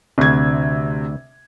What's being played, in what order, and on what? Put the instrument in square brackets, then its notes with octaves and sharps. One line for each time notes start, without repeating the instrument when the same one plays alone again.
[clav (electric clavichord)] D2 [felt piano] C3 G#6